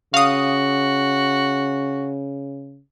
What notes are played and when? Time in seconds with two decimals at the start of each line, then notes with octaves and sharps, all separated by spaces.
0.14 C#3 F#4 F5 D#6